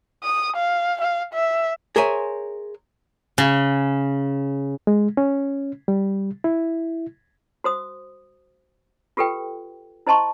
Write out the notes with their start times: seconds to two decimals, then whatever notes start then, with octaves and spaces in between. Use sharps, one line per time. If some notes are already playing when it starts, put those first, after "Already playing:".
0.23 D#6
0.56 F5
1.01 F5
1.33 E5
1.96 G#4 A#4 C5 C#5 E5 G#5
3.38 C#3
4.87 G#3
5.17 C#4
5.88 G3
6.44 E4
7.64 F#4 C5 D#6
9.17 F4 G4 A4 B4 G5
10.07 E4 C5 D#5 A5 C6 C#6